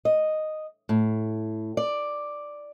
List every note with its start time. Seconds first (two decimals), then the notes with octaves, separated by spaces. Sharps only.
0.05 D#5
0.89 A2
1.77 D5